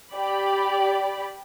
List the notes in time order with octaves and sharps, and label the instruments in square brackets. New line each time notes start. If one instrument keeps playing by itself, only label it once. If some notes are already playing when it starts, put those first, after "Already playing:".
[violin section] G4 D5 B5